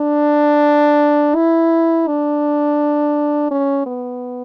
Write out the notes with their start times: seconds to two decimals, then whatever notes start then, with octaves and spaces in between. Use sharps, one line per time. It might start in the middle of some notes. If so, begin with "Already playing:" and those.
Already playing: D4
1.35 E4
2.07 D4
3.51 C#4
3.87 B3